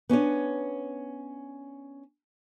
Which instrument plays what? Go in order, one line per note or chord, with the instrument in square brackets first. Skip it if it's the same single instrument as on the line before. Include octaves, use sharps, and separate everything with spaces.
[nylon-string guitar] B3 C#4 D4 C#5